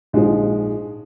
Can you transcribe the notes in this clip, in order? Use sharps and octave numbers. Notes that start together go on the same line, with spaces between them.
A#1 G#2 F3 G#3